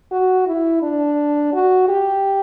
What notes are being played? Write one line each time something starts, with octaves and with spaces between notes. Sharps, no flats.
F#4
E4
D4
F#4
G4